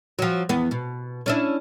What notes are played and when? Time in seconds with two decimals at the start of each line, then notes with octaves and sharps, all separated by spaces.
0.19 F3 F#3
0.49 E2 B3
0.71 B2
1.26 C#4 D4 E4